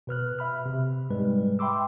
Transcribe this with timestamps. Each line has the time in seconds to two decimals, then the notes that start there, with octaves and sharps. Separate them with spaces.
0.07 B2 B4 F6 F#6
0.39 E5 B5 F6
0.66 C3
1.10 G#2 G3 G#3 B4
1.59 E5 G5 B5 C6 D6 E6